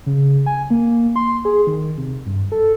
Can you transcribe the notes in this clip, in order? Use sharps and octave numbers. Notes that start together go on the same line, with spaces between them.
C#3
G#5
A#3
C6
G#4
D#3
C3
G2
A4